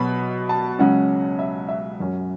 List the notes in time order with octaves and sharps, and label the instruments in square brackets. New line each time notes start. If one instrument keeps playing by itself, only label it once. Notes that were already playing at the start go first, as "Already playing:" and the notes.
Already playing: [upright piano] B2 F#3 B3 B5
A5
C#2 C#3 F#3 C#4 F#5
E5
E5
F#2 F#3 C#4